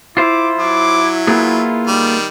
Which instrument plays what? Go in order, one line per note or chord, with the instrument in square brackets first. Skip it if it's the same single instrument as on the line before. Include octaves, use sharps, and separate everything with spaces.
[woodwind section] E4 [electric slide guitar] F4 C5 [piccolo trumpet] D6
[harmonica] F#3 [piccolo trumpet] D6
[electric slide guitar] A#3 B3 G#4 [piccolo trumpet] F4
[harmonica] D#3 G3